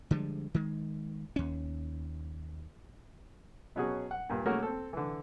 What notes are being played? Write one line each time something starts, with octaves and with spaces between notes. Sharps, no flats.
D3 F3 G3 G#3
D#3 G#3
D#2 C#4
B2 F#3 C#4 F#4 G#4
F#5
G2 A#2
A3 A#3 C#4 F#4 G#4 A#4
C4 A4
D3 E3